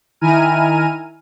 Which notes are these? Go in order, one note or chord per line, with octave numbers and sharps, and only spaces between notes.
D#3 E4 G#5 A#5 F6 D#7